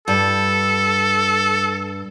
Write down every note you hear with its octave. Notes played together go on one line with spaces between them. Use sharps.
G2 A4